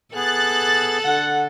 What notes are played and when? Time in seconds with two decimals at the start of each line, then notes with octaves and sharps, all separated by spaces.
0.15 B3 G#4 A4 F#6 A6
1.05 D3 F#5